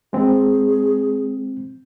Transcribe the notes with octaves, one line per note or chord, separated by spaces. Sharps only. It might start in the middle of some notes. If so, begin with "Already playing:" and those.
G#3 C4 G#4